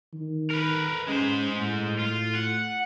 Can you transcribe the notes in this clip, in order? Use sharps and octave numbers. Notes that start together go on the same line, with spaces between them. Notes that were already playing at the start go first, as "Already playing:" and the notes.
D#3
A#4 B4
G#3 C#4 C5
A2
F4
F#5